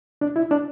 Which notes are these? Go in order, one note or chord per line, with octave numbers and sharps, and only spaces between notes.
D4
E4
D4